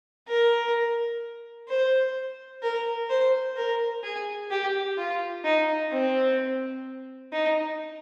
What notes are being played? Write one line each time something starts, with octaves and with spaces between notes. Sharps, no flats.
A#4
C5
A#4
C5
A#4
G#4
G4
F4
D#4
C4
D#4